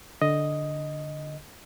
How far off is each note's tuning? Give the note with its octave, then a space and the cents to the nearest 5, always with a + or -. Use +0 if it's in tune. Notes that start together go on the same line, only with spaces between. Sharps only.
D3 +0 D#5 +0